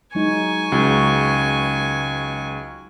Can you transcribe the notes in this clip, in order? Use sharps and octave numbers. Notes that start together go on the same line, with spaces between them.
F#3 G#3 D#4 G#5 C#6
C#2 F#4